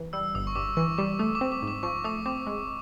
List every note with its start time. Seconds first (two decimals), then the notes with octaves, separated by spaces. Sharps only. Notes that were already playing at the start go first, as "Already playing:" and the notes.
Already playing: E3
0.13 G3 E6
0.34 G1 D#6
0.47 C#6
0.55 G2 D6
0.77 E3 C#6
0.98 G3 D6
1.19 A3 D#6
1.35 D6
1.41 C4
1.52 D6
1.62 G#2
1.68 D6
1.83 F3 C#6
2.04 A3 D#6
2.26 C4 D6
2.47 G#3